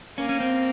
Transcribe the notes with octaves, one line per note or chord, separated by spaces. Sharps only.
A#3 C#4
C#4
C4